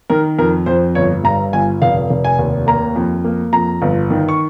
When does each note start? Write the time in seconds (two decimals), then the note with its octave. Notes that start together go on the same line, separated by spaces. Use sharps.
0.10 D#3 A#4
0.39 F2 A#4
0.66 F2 C5
0.95 G1 C#5
1.24 G2 A#5
1.53 G1 G#5
1.82 F1 F5
2.10 F1
2.24 G#5
2.39 D#2
2.67 A#3 A#5
2.96 F2
3.24 A#3
3.53 F2 A#5
3.82 G1
4.10 D#3
4.29 C#6